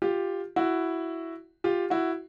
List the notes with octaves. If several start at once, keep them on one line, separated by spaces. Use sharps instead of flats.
F4 G4
E4 F#4
F4 G4
E4 F#4